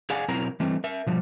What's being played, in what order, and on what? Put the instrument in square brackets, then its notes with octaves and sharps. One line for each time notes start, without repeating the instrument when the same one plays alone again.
[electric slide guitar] G#4 D5 F5 F#5 G#5
B2 F#3 C4 E4 A#4 A#5
E3 G3 A3 C4
A#4 E5
B2 F3 G3